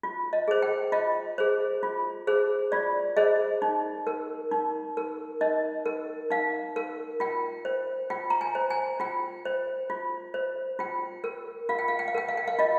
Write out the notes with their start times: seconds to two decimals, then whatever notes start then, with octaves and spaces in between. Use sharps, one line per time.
0.03 F4
0.33 D#5
0.48 G#4 C5
0.62 G5
0.92 F4 D#5
1.38 G#4 C5
1.83 F4
2.27 G#4 C5
2.72 F4 D5
3.17 G#4 C5 D#5
3.62 D#4
4.07 A#4
4.52 D#4
4.97 A#4
5.41 D#4 D#5
5.86 A#4
6.31 D#4 F5
6.76 A#4
7.20 F4 G5
7.65 C5
8.10 F4 G5
8.30 A#5
8.41 G#5
8.55 C5
8.70 G#5
9.00 F4 G5
9.45 C5
9.90 F4
10.34 C5
10.79 F4 G5
11.24 A#4
11.69 F4 F5
11.79 G5
11.88 F5
11.99 G5
12.08 F5
12.15 A#4 G5
12.29 F5
12.37 G5
12.48 F5
12.59 F4 D#5